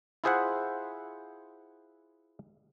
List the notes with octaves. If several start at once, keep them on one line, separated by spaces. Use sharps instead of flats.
E4 F4 G#4 C5 E5 F#5